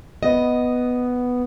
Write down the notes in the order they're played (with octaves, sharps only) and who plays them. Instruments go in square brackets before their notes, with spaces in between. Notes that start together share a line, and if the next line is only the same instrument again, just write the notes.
[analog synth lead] B3 [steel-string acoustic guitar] D#5